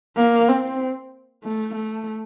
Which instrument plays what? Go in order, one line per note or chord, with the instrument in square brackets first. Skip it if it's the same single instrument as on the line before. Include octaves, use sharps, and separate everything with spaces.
[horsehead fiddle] A#3
C4
A3
A3